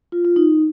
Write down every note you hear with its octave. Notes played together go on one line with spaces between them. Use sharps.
F4
F4
D#4